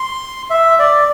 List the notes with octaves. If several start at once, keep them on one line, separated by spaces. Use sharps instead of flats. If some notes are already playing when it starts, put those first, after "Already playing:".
Already playing: C6
E5
D5